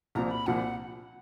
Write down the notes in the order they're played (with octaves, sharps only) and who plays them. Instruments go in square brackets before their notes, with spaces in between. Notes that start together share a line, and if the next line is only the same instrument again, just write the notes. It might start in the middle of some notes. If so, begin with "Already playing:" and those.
[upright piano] C2 A#2 F3 [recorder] A#5
[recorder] B5
[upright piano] C2 A#2 F3 [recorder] F#5